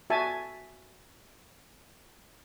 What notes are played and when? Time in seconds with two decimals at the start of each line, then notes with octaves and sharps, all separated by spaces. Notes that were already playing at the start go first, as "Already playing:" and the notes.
0.10 F#4 E5 G#5 A5